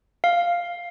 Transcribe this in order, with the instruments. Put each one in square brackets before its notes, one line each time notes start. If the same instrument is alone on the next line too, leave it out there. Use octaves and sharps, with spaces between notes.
[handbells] F5